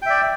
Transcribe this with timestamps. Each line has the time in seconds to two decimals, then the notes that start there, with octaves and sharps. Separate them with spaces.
0.02 G5
0.06 E5
0.10 D5